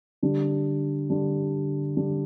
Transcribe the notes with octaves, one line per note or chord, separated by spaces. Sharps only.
D3 G3 D4
D3 G3 D4
D3 G3 D4